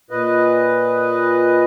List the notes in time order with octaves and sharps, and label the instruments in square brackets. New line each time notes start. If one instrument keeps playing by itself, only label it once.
[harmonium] A#2 B4 D#5